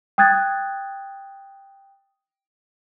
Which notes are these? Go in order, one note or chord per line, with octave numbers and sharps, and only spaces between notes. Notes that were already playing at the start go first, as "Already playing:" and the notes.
G5 D#6 F#6 G#6 A6